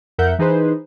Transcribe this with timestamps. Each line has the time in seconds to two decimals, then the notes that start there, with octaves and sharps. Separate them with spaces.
0.18 F2 A#4 E5 F#5 G6
0.39 E3 D#4 G#4 B4 C5